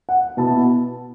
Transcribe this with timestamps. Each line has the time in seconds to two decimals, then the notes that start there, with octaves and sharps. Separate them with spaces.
0.09 F#5
0.37 B2 B3 E4 A5